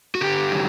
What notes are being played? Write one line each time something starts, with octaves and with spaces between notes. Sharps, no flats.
F#4
D3 G4
F#3